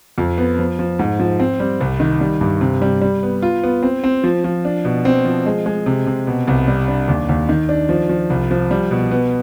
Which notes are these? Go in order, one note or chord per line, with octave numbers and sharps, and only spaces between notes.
F2
B3
F3
F3
G#2
F3
C4
G3
C2
D#3
G3
G2
C3
G3
G3
B3
F4
B3
C4
C4
F3
F3
D4
B2
C4
F3
G#3
G#3
C3
C3
B2
C2
G3
D4
D#2
D#2
D#3
D4
F3
F3
C2
F3
G3
B2
B3